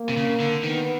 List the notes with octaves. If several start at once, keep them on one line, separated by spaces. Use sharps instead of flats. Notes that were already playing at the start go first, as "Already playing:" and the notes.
Already playing: A#3
C3
C#3
D3
D#3 B3